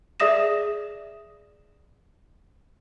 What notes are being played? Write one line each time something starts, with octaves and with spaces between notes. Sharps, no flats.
G#4 D5 E5 D#6 A#6 E7